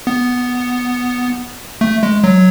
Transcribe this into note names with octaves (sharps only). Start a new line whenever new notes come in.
B3
A3
G#3
F#3